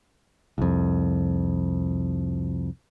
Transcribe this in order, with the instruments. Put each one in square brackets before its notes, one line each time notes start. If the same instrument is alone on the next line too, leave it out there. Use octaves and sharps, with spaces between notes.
[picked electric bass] C2 F2